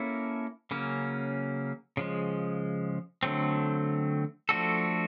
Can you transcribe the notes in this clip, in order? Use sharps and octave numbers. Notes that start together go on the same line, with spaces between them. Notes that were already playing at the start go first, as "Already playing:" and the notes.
Already playing: A#3 C#4 E4 A4
C#3 F#3 A#3 C#4
C#3 F3 G#3
D3 F#3 A3 C4
F3 A3 D4 F#4 A4